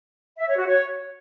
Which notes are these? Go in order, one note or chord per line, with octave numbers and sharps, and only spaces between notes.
E5
C#5
F#4
C#5